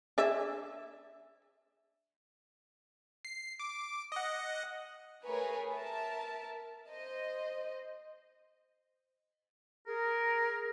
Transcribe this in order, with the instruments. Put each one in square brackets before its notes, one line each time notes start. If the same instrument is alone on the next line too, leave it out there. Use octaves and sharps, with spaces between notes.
[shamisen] D4 G#4 E5
[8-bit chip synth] C7
D6
D#5 F#5
[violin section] A3 G#4 A#4 B4 C#5 G#5
A#4 E5 A5
C5 D#5
[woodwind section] G#4 A#4